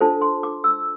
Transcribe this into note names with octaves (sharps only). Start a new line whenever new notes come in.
D4 F4 A4 C5 A5
C6
D6
E6